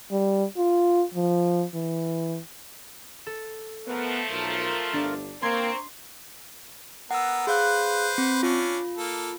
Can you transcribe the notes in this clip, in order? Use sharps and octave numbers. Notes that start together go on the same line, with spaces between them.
G3
F4
F3
E3
A4
F3 A3 B3 A#4 B4
B1 F4 A#4
G1 D4
A#3 C4 A#5 C6 C#6 G#6
B3 A#4 F#5 E6
G#4 B4 C5 F5 F#6
C4
C#4 D4 F4
A#3 A4